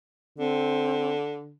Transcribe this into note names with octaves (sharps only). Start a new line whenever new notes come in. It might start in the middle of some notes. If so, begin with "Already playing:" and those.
D3 C4